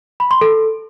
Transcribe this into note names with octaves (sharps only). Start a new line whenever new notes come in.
B5
C6
A4